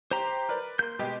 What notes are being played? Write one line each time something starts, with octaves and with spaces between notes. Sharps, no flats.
G4 C5 A#5 C6
A#4 B4 D5
A#3 C6 G6
B2 G#3 G4